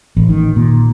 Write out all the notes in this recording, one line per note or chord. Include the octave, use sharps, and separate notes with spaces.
A1
D#3
A#2